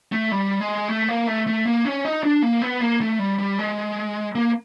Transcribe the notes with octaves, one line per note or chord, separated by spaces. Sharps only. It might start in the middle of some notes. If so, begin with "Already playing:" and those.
A3
G3
G#3
A3
A#3
A3
A3
A#3
C#4
D#4
D4
A#3
B3
A#3
A3
G3
G3
G#3
A#3